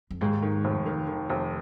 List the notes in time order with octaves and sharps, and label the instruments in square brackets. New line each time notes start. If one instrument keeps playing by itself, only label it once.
[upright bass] F2
[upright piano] D#2 [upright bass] G#2
[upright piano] D#3
F1
D#3
D#3
F1